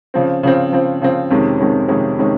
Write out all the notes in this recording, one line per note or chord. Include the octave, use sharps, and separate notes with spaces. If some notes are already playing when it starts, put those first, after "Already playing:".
C#3 F3 C4
C#3 F3 C4
C#3 F3 C4
C#3 F3 C4
F2 C3 D#3 G#3 C#4
F2 C3 D#3 G#3 C#4
F2 C3 D#3 G#3 C#4
C3 D#3 G#3 C#4